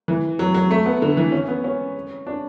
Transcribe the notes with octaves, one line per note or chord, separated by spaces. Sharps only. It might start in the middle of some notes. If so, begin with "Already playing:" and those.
E3
F#3
F#3
A3
B3
D3
E3
C#4
B3
C#4
D4